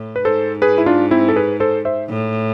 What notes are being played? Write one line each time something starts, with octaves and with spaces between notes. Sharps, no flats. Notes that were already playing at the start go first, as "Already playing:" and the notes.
Already playing: A2
B4
G#2 A4 C5
G#4 B4
E4
D4 F4
C4 E4
A4
G#4 B4
A4 C5
C5 E5
A2